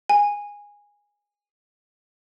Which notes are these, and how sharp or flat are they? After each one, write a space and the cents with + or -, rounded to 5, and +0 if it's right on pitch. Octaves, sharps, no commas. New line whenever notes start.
G#5 -15